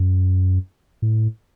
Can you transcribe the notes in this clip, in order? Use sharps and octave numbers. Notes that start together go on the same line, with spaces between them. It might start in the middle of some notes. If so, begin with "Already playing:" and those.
Already playing: F#2
A2